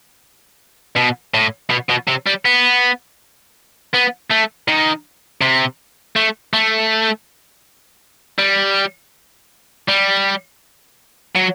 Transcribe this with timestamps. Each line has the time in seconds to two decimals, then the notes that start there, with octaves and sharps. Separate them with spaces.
0.96 B2
1.34 A2
1.70 B2
1.90 B2
2.08 C3
2.27 G3
2.45 B3
3.94 B3
4.30 A3
4.68 D#3
5.41 C3
6.16 A3
6.54 A3
8.39 G3
9.88 G3
11.36 F#3